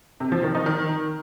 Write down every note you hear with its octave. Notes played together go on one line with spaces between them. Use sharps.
C3
F3
D#3
D#4
D#3